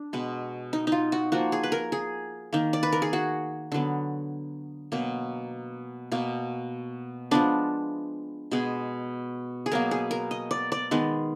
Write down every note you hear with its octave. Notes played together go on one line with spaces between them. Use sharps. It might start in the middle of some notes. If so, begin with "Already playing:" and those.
Already playing: D4
B2 G#3 B3
D#4
D#4 F4
F#4
F3 A#3 F#4
G#4
B4
A#4
G#4
D#3 A#3
D5
B4
A#4
G#4
F#4
D3 F#3 B3
B2 F#3 A#3
B2 A#3
F3 G#3 B3 D4
B2 G#3 B3 G#4
G#4
B2 F#3 A#3 A#4
G#4
A#4
D#5
D5
D5
D#3 G#3 B3